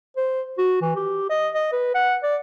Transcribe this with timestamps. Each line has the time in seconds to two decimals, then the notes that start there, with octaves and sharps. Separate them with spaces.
0.17 C5
0.58 F#4
0.81 E3
0.96 G4
1.30 D#5
1.55 D#5
1.72 B4
1.95 F#5
2.23 D5